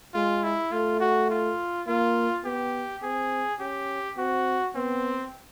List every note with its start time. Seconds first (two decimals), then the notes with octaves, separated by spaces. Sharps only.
0.14 G#3 F4
0.43 E4
0.72 A3 F4
1.00 F#4
1.30 F4
1.87 A#3 F4
2.44 B3 G4
3.02 C4 G#4
3.60 C#4 G4
4.18 C4 F#4
4.75 B3 C4